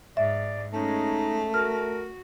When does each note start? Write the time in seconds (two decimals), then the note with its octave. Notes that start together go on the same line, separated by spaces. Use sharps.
0.17 G#2 D5 E5
0.73 G#3 A3 C#4 D#4
1.54 F#4 A#4 F6